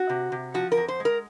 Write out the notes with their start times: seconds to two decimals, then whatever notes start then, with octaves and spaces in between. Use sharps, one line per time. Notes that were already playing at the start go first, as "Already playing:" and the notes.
Already playing: F#4
0.09 C3
0.32 C3
0.54 F3 F#4
0.72 A#4
0.77 F2
0.88 C5
1.00 G#3
1.05 A#4